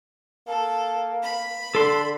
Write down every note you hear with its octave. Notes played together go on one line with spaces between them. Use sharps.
A#3 A4
B5
D3 A4 C6